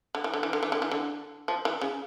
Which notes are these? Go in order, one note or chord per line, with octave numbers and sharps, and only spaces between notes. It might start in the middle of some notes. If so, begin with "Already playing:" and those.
D3
E3
D3
E3
D3
E3
D3
E3
D3
F3
E3
C#3